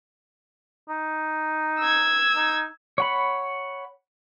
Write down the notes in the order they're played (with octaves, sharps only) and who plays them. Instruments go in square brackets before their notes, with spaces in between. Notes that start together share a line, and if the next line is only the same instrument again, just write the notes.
[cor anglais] D#4
[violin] E6 G#6
[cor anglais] D#4
[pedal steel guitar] C#5 F#5 B5